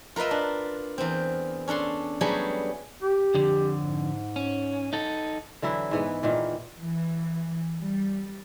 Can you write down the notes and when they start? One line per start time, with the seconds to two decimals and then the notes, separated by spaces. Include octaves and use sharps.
0.16 F4 A#4 B4 D#5 E5
0.31 D4
0.98 E2 C4
1.68 C#4 D4 A4 C6
2.21 F#3 G3 A3 B3 G#4
3.02 G4
3.34 F2 D3
3.81 G#2
4.36 C#4
4.93 D#4 A4
5.62 D3 E3 F#3 E4
5.91 G#2 E3 B3
6.23 A#2 D#3 E3
6.79 E3
7.81 G3